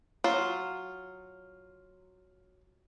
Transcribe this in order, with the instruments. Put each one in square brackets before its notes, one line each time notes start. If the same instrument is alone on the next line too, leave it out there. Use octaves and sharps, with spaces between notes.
[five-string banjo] F#3 F4